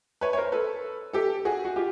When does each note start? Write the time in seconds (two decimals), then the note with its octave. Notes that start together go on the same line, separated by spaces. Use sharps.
0.21 B4 C#5
0.33 C#5
0.37 A#4 C5
0.52 A4 B4
1.13 G4 A4
1.45 F#4 G#4
1.65 F#4
1.76 F4 G4